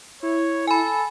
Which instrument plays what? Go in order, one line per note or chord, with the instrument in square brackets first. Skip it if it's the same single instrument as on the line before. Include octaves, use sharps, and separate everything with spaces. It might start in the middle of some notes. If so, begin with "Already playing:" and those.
[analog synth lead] E4 [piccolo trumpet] C#5
[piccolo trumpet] A4 [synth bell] G#5 B5